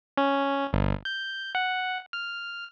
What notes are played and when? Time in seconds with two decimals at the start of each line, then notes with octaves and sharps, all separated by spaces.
0.18 C#4
0.73 G1
1.05 G6
1.55 F#5
2.13 F6